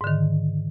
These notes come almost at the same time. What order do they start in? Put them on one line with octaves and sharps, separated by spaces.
G#2 D3 D#3